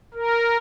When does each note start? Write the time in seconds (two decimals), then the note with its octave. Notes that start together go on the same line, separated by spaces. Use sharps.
0.14 A#4